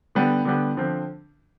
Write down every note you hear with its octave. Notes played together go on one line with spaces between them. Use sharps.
D3 G3 B3
D3 G3 B3
D3 F3 C4